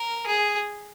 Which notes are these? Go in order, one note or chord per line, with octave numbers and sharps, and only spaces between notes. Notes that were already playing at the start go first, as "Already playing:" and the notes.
Already playing: A#4
G#4